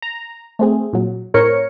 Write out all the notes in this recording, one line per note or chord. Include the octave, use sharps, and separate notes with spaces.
A#5
A3 C4 G#4
A#2 F#3
A2 C4 A#4 C#5 C#7